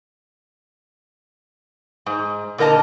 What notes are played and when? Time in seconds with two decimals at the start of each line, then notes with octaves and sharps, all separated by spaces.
2.06 G#2
2.58 A#2 D3 A#4 D#5 A5